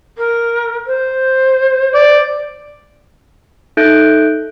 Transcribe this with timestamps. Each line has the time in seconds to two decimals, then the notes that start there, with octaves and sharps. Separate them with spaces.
0.18 A#4
0.86 C5
1.95 D5
3.77 D#4 A4 E5 F#6 G6 D7